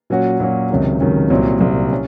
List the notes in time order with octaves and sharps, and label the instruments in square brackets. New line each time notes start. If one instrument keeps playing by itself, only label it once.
[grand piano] A#2 F#3 C#4 F#4
A#2 F#3 C#4 F#4
C#2 C3 D#3 F#3 C#4
C#2 C3 D#3 F#3 C#4
C2 A#2 F#3 C4
C2 A#2 F#3 C4
C#4